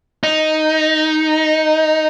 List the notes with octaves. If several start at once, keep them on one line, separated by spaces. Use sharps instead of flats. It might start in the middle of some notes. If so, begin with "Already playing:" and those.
D#4